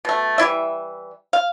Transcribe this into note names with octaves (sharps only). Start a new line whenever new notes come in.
B2 A3
E3 G3 E4 E5
F5